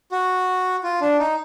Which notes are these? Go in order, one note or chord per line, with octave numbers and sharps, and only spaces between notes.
F#4
F4
D4
D#4